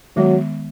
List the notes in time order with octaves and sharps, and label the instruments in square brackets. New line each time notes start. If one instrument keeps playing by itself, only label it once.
[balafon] D#3 G#3 B3 [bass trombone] F#3